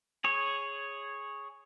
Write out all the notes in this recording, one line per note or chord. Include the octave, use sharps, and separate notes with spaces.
G#4 C#5